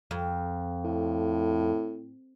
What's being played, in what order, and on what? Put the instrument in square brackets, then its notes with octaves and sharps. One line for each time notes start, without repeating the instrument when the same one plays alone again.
[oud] F2
[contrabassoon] A2